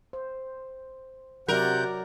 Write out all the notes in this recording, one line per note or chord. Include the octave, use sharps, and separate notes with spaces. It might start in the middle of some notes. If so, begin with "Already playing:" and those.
C5
C3 F#3 F#4 A#4 D5 F#5 G6